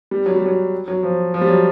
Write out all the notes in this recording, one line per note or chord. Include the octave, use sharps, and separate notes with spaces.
G3
F#3
G3
F#3
F#3
F3
F3
G3
F#3